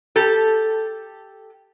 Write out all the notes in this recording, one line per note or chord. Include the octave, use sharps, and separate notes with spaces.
G4 A4